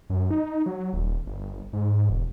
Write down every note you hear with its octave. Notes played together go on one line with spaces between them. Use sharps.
F#2
D#4
F#3
D#1
G1
G#2
E1